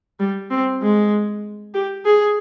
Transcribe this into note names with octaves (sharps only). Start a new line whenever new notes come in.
G3
C4
G#3
G4
G#4